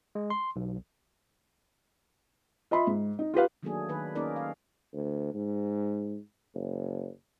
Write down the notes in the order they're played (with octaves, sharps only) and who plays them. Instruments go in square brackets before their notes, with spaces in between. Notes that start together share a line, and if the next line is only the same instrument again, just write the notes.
[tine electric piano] G#3
C6
B1
[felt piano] F4 D#5 E5 B5 C6
G#2
D#4
F4 G4 B4 F5
[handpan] D#3 F#3 A3 A#3 D4 G#4
D#3 B4
A#3 C#4 D#4 G#4 A#4 D5
F5
[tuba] D2
G#2
F#1